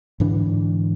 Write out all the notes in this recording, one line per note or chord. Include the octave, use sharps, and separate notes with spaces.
G#2 D3 E3 D4